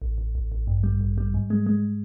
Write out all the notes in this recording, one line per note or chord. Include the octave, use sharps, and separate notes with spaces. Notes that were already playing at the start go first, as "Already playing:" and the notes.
A1
A1
A1
A1
G2
G3
A1
G3
G#2
G#3
G#3